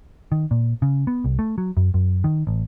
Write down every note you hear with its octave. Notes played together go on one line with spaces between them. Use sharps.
D#3
A#2
C#3
B3
C2
A3
F#3
F#2
F#2
D#3
A1